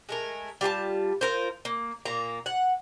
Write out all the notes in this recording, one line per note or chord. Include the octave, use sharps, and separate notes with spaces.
G#3 A3 A#4
G3 F4 G5 A5
F4 A#4 C5
A#3
A#2 A#3 A#5
F#5